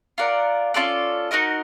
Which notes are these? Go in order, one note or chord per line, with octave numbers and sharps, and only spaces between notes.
F4 A#4 D5 F#5
C#4 F4 A4 D5
D#4 F#4 A#4 D#5